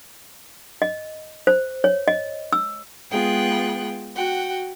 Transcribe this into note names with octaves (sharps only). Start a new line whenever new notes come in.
D#5
C5
C#5
D#5
E6
G#3 B3 F4 G#4 G5 F#6
F#4 F#5 G5